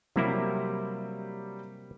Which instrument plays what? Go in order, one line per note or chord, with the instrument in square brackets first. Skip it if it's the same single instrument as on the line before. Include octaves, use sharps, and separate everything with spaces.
[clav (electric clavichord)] C3 A#3 E4 [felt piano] F#3 G3 G4